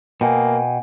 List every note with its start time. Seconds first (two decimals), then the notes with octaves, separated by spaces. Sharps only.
0.21 B2 A#3 G5 G#5